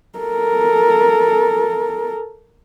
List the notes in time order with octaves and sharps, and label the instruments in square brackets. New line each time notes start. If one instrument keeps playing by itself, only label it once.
[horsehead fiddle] A4 A#4